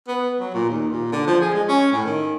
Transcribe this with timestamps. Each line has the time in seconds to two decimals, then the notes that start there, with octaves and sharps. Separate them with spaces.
0.08 B3
0.40 F#3
0.54 A#2
0.69 D#2
0.91 A#2
1.12 D3
1.27 F3
1.41 G#4
1.54 G#3
1.68 C#4
1.92 A2
2.05 D#3